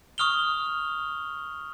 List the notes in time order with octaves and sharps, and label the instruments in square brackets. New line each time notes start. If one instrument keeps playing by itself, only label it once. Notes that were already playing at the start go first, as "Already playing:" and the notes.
[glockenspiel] C#6 D#6 F6 F7 G7